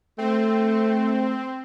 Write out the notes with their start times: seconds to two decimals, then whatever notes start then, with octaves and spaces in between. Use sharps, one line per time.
0.18 A3 C4